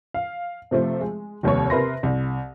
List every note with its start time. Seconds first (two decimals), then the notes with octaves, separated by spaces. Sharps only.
0.14 F5
0.71 C3 F3 A3 C4
1.01 G#3
1.43 F1 D#2 G3 C#5
1.70 C3 A#4 B4 E5 C6 A#6
2.03 C2